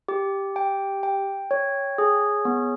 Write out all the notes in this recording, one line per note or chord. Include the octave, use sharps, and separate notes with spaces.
G4
G5
G5
C#5
G#4
B3